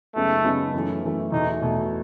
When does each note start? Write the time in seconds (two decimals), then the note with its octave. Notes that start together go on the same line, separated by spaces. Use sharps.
0.16 F#2 C#3 G#3 A3 B3 D#4
0.44 F#2 C#3 G#3 B3 D#4
0.74 F#2 E3 A3
1.03 F#2 E3 A3
1.32 E2 B2 A3 D#4 E4
1.61 E2 B2 A3 E4